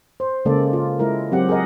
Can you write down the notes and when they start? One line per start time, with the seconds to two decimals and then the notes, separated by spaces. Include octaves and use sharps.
0.20 C5
0.45 C#3 G#3 A#3 A4 D5
0.73 F4
0.99 G#3 E4 A#4
1.31 F#3 C4 G4 F#5
1.49 G#4 A#4 D#5 F#5